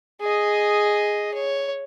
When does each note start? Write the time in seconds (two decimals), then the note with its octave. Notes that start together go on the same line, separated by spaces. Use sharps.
0.21 G#4 D#5
1.34 C#5